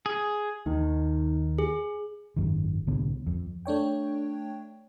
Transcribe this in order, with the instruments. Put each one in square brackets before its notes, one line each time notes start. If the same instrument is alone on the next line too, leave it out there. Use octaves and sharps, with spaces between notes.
[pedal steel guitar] G#4
[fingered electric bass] D#2 [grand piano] D#3 [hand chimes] D#4
[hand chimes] G#4
[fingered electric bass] G#1 F#2 D#3
C2 A2 D3 B3
F2
[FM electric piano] A3 D4 C#5 G5